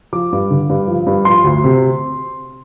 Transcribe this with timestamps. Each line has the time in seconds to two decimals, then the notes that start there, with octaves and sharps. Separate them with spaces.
0.13 F3 D6
0.32 G2
0.50 D3
0.69 G2
0.88 F3
1.06 G2
1.25 F3 C6
1.44 D2
1.64 C3